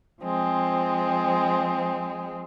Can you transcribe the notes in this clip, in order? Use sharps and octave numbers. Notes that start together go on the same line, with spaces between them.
F3 G#3 C4